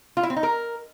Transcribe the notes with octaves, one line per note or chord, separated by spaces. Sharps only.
F4
E4
C4
D#4
A#4